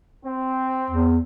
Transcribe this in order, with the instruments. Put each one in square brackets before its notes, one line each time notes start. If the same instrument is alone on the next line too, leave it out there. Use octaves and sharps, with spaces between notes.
[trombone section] C4
[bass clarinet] E2